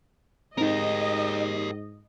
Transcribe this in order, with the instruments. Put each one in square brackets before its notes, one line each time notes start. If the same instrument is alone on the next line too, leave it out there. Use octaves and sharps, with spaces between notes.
[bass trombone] G#2 [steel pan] C4 D#4 [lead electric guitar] G4 A#4 [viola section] D#5